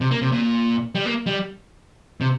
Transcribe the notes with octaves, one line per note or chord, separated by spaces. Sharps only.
C3
A#3
C3
A#2
G3
A#3
G3
C3